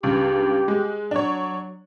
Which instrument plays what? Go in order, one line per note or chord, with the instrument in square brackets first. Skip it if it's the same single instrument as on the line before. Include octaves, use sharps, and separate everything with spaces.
[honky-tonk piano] C#2 G2 [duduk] G4
[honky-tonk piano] G#3
[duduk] F#3 [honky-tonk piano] D4 C#5